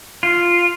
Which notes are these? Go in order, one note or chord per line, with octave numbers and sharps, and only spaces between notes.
F4